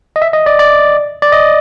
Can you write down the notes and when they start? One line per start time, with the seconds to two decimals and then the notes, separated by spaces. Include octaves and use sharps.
0.16 D#5
0.22 E5
0.33 D#5
0.46 D5
0.59 D5
1.22 D5
1.32 D#5